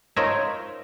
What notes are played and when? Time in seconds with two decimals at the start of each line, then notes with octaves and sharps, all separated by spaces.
0.16 D#4 F4 A#4 C5 C#5 E5